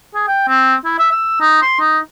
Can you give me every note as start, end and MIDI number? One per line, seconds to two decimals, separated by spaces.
0.15 0.24 68
0.28 0.47 79
0.48 0.74 60
0.85 0.94 64
0.98 1.09 76
1.11 1.36 88
1.41 1.57 63
1.62 1.77 84
1.80 1.98 63